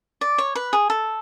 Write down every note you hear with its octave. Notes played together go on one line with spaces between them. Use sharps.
D5
C#5
B4
G#4
A4